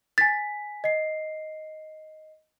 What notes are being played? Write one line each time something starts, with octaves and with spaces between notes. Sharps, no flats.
G#5 A6 B6
D#5 C7